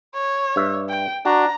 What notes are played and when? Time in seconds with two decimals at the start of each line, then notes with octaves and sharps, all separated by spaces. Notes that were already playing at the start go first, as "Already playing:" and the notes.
0.15 C#5
0.56 G2 E5
0.89 G5
1.25 D4 F#4 A#5